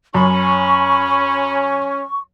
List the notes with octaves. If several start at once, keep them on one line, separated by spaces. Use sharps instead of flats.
F#2 C#4 B5 C#6